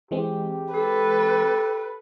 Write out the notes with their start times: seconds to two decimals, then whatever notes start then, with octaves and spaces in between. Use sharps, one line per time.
0.11 E3 G#3 C4 G4
0.74 A4 B4